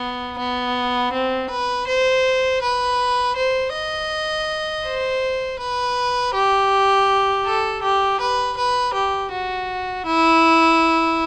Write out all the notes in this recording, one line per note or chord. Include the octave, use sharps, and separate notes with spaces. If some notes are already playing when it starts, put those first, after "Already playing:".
Already playing: B3
B3
C4
B4
C5
B4
C5
D#5
C5
B4
G4
A4
G4
B4
B4
G4
F#4
E4